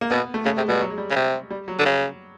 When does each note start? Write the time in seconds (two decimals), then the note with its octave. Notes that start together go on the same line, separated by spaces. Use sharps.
0.01 A#3
0.10 B2 B3
0.34 A3
0.45 C#3 A3
0.57 C3 G#3
0.68 B2 G3
0.81 F#3
0.90 G#3
0.98 G3
1.11 C#3
1.16 C3
1.50 G3
1.68 F#3
1.79 D3
1.85 C#3